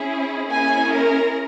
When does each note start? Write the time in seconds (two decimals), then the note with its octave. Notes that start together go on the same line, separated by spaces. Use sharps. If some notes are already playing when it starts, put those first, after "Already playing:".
Already playing: C#4 E4 G#4
0.49 A#3 C#4 E4 G#4 G#5
0.90 A#4